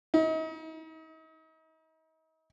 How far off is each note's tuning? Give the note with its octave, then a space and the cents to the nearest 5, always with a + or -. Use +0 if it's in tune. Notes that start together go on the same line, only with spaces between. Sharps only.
D#4 +40